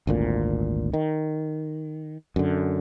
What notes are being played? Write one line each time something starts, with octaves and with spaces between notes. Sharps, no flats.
G#1 D2 A#2
D#3
F#2 D3